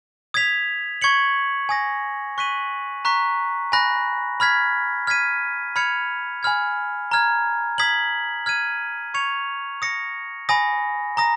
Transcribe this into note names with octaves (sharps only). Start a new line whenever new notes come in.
D#6 G#6 B6 F7
C#6 G#6 C#7 F#7
G#5 D#6 A#6
C#6 F#6 B6 D#7 F#7
A#5 C#6 F#6 B6
G#5 B5 F#6 A#6
B5 F6 G#6 B6
F6 G#6 B6 D#7
B5 F6 G#6 C#7 F7
G#5 B5 F6 G#6
A#5 F6 G#6
D#6 G#6 B6 F#7
F6 G#6 D#7
C#6 G#6 C#7 F7
D#6 A#6 C#7
G#5 B5 D#6 A#6
A#5 D#6 A#6